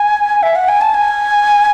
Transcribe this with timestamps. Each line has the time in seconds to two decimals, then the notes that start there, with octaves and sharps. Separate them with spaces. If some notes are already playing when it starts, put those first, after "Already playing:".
Already playing: G#5
0.43 E5
0.56 F#5
0.68 G#5
0.81 A5
0.94 G#5